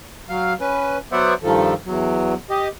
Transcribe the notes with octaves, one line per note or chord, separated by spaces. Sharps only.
F#3 F5
C#4 B4
F#3 B3 C5 D5 E5 F#5
G2 D#3 F3 A3 A4
E2 F#3
G4 D#5